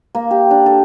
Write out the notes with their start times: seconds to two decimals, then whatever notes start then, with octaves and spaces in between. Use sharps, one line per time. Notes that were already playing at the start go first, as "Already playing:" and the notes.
0.15 A#3
0.31 G4
0.51 D4
0.66 A4